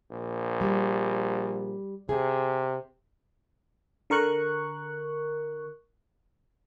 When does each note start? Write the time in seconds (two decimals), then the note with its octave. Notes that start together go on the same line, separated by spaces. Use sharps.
0.11 A#1
0.61 G3
2.09 C3 G#4
4.10 D3 A#4 C#6 F#6